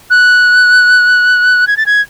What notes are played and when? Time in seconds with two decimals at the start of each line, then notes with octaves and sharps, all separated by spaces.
0.10 F#6
1.67 G#6
1.77 A6
1.86 G#6